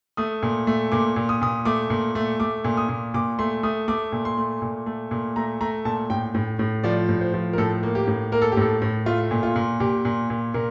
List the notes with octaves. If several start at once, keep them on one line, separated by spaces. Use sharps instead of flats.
A3 D#6
A#2
A3
A#2 D6
A#2
D#6
A#2 D#6
A3 D6
A#2
A3
A3 D6
A#2
D#6
A#2
A#2 D6
A3 C6
A3 D#6
A3 D6
A#2
C6
A3
A#2
A3
A#2
A3 A#5
A3 A#5
A#2 A5
A2 G5
A2
A2
F3 D5
A2
C5
F3
A#4
A2 A4
A#3
G4
A2
A#3 A#4
A4
G4
A2 A4
A2
A3 F4
A#2
F4
A#2
A#2 G4
A#2
A#2
A#2 A#4